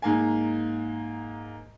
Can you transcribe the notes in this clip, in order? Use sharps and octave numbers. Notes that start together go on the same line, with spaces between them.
G#2 A#3 G#5